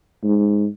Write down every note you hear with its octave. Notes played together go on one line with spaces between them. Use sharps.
G#2